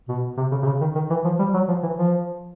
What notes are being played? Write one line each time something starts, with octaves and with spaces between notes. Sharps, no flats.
B2
C3
C#3
C3
C#3
D#3
D#3
E3
F3
G3
F#3
F3
E3
F3